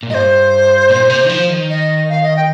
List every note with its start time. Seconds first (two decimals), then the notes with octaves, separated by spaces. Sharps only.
0.03 A#2
0.10 G2 C5 D#5
0.89 A#2
1.09 C3
1.25 D#3
1.29 F3
1.50 D#3
1.69 D#5
2.09 F5
2.23 D#5
2.36 G5